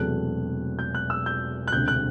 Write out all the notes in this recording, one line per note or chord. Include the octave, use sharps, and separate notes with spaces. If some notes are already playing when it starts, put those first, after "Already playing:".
Already playing: E1 E2 C3 F#3 A3 F#6
G6
F#6
E6
G6
F#6
E1 D2 C3 G6
F#6